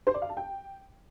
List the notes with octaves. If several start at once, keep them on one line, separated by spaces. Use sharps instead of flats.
C5
D5
F5
A5
G5